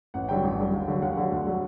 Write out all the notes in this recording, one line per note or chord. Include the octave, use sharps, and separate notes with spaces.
A1 F#5
G2 D3 F#3 G5
A1
G2 D3 F#3
D#2
D3 F#3
D#2 F#5
D3 F#3
D2
D3 F#3